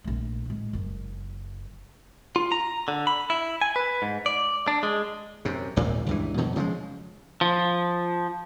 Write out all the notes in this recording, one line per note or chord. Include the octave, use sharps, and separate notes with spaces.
A#1 A3
A2 G#3
F#1 F#2
F4
A#5
D3
B5
E4
G#5
B4
G#2
D5
D4
G#3
F#2 C3
G#1 D#2 A#2 A#3
C#2 G2 E3
F2 B2 D#3
C#3 F3 G3 G#3
F3